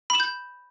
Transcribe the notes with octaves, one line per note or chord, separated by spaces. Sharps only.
B5 G6 E7